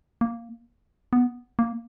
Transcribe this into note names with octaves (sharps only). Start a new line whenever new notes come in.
A#3
B3
A#3